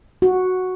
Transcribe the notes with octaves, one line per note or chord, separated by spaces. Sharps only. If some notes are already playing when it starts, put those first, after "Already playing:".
F#4